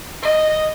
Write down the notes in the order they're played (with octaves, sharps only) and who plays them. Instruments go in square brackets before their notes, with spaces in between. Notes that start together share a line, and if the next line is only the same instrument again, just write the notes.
[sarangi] D#5